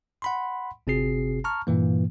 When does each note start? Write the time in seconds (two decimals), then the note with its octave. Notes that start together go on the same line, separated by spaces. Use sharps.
0.22 F#5 B5 C6
0.87 G1 C3 C4 F#4 G#4 C7
1.44 A5 A#5 C#6 F6
1.67 G2 A#2 E3 A#3